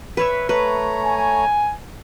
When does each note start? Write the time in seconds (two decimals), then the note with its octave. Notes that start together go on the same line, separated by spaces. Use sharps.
0.17 B4 C#5 E5
0.49 A3 B4 C#5 A#5
1.05 G#5